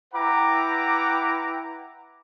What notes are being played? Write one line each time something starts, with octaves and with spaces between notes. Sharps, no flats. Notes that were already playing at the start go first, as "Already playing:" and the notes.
E4 B4 F#5 G5 A#5 D6